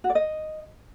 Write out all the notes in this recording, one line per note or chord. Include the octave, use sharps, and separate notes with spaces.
F#4
D5
D#5